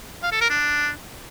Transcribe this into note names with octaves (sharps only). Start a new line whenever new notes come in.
F5
A4
A#4
D4